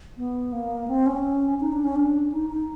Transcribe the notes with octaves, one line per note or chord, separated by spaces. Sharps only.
B3
A#3
C4
C#4
D#4
D4
C#4
D4
D#4
D#4